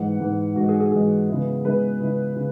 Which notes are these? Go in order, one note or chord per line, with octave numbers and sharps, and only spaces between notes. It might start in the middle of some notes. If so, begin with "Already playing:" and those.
Already playing: G#2 E3 G#3 F#5
G#2 E3 G#3
G#2 E3 G#3 F#4
G#4
G#4
G#2 E3 G#3 G#4
C#3 G#3 B3 E4
C#3 G#3 B3 E4 B4
C#3 G#3 B3 E4
C#3